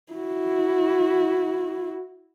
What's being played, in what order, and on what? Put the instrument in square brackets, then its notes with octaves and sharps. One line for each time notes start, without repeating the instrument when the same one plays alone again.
[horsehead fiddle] E4 F#4